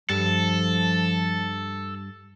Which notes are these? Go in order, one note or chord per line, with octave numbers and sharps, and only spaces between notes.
G2 F3 A4